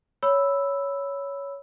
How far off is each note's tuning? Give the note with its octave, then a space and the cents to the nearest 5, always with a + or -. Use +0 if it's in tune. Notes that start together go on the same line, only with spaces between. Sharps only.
C#5 +10 B5 +0 E6 +0